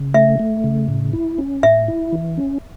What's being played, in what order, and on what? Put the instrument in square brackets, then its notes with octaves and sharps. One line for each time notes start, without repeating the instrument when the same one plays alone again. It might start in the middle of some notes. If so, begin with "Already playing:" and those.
Already playing: [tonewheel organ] C#3
[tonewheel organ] A3 [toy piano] E5
[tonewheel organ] A3
C#3
A2
E4
C#4
[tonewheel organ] A2 [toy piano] E5
[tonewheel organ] E4
E3
C#4